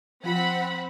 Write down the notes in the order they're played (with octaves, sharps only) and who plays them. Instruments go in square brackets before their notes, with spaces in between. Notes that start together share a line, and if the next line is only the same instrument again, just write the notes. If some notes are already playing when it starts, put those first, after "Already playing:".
[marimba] F3 F4 [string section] C4 F#5 B5